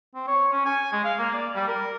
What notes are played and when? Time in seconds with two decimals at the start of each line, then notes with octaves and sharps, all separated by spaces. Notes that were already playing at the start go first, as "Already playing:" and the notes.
0.15 C4
0.27 C#5
0.52 C#4
0.66 G#5
0.92 G#3
1.04 F5
1.19 A#3
1.34 D5
1.55 G3
1.68 A#4